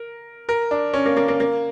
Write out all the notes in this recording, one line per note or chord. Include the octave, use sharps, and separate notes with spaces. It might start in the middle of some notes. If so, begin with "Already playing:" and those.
Already playing: A#4
A#4
D4
C#4
A#3
A#3
A#3
A#3